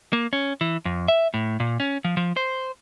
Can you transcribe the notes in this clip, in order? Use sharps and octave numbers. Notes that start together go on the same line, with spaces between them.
A#3
C#4
E3
F2
E5
A2
A#2
C#4
F3
F3
C5